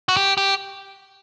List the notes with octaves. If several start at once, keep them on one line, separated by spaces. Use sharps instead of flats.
F#4
G4
G4